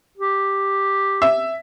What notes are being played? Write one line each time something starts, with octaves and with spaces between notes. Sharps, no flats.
G4
E5